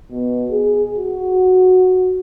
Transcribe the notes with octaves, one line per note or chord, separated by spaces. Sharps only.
B2
G#4
F#4